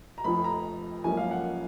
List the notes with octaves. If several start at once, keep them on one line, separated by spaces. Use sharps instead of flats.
A#5
F1 F2 F3 B5
A#5
G#1 F#2 F3 A#3 C#4 G#5
F5
F#5